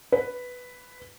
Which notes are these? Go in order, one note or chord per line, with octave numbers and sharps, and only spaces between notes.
B4